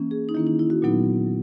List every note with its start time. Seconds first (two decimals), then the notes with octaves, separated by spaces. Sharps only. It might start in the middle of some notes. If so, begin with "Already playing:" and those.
Already playing: E3 A#3 C#4
0.11 G#4
0.29 D#4
0.35 D#3 A#3 C#4 E4
0.47 D#4
0.59 E4
0.70 F#4
0.82 A#2 F#3 B3 D#4